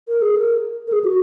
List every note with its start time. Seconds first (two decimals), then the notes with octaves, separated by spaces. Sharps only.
0.08 A#4
0.22 G#4
0.36 A#4
0.87 A#4
0.92 G#4
1.04 F#4